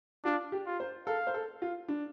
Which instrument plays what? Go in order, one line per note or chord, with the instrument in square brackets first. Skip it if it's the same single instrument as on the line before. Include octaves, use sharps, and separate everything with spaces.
[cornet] D4 [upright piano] F4
[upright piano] G4
[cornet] F4
[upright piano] C5
[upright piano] A4 [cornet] F5
[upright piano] C5
A4
F4
D4